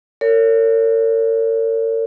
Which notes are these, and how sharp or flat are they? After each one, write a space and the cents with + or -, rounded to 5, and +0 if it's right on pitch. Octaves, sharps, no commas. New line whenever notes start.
A#4 -40 C#5 +20